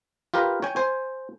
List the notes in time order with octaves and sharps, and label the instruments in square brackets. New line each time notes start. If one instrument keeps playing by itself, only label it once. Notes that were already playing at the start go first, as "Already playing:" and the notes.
[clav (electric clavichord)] F4 G4 A#4 B4
C#5 G5 G#5
C5 G#5